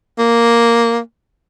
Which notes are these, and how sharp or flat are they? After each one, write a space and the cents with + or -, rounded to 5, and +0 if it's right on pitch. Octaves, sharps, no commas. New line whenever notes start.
A#3 +0